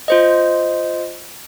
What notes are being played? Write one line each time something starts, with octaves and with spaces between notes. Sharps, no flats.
F4 C5 D#5